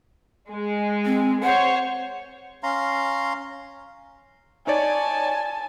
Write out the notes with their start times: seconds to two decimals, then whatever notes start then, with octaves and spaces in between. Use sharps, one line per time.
0.51 G#3
1.05 C4
1.43 C5 C#5 F#5
2.63 C#4 F5 A#5 C6
4.67 D#4 C#5 D5 G#5 A5